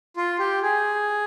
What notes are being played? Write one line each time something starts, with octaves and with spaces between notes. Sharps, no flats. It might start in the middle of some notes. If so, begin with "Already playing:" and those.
F4
G4
G#4